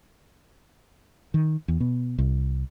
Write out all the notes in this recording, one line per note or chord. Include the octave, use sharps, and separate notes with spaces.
D#3
E2
B2
C2